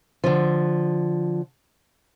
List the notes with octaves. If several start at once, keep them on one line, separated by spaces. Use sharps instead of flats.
D3 F3